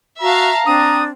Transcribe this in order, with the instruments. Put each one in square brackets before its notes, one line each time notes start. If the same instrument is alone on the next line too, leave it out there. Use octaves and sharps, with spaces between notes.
[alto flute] F#4 [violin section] E5 F5 A5 [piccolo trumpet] A#5
[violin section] C4 [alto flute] D4 [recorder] D#6